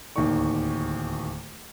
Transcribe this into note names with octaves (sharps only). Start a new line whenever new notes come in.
D1 D#2 D#3 D5 C#6